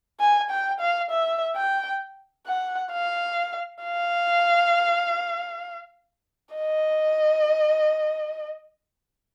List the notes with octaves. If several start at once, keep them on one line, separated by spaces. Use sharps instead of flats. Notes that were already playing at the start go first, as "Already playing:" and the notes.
G#5
G5
F5
E5
G5
F#5
F5
F5
D#5